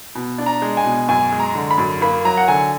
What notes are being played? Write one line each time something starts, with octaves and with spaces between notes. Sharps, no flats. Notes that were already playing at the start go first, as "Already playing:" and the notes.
B2
D4
A#5
G#3
G#5
B2
F#2 G#5
G#3
A#5
D3
B5
F#2
A#3 B5
F#3 A#5
F#5
D3 G#5